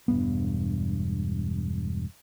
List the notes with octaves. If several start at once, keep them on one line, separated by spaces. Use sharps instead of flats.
E1 G2 B3